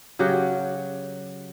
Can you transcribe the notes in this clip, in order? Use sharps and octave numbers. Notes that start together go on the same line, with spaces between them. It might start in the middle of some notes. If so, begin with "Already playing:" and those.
C#3 F#3 G4 F#5